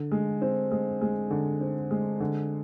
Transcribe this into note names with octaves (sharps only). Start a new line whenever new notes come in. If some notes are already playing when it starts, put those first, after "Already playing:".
Already playing: D3
G#3
C4
G#3
G#3
D3
C4
G#3
D3